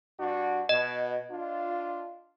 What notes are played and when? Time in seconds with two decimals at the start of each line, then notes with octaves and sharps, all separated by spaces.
0.18 G2 D4 F#4
0.69 B2 D#5
1.30 D4 F4